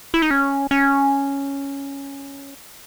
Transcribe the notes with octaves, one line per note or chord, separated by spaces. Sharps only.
E4
D#4
C#4
C#4